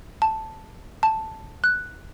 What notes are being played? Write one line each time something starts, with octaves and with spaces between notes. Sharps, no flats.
A5
A5
F#6